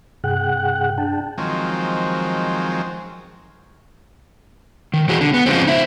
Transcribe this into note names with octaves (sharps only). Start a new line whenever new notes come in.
G2 C3 G#4 F#5 G5 F#6
D4 G5 A5
D#3 F3 F#3 G#3 C4
D#3
E3 F#4 G#4
D3
B3
C#3 F3 G#3 C4
D#4 E5